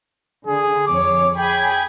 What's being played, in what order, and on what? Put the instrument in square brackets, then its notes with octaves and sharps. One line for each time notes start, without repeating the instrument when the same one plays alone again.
[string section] D3 [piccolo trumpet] G#4
[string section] F2 C#5 [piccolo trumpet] D6
[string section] G#4 G#5 B5 [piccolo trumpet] G5